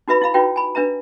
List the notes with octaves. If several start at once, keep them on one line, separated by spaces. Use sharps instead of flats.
D#4 F#4 B4 E5 B5
E4 E5 F5 B5
D#4 F4 F#4 B4 C#5 G5
G#5 B5
D4 B4 E5 A#5